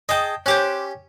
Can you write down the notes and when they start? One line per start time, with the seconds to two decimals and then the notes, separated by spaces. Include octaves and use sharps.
0.09 G#4 D#5 G5 A5
0.46 C#4 G4 C5 D6 F#6